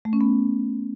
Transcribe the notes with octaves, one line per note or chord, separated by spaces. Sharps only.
A3
C#4
B3